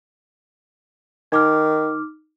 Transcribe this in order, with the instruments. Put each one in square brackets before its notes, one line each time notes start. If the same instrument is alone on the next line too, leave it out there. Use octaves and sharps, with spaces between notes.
[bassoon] D#3 [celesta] D#4 D6 F6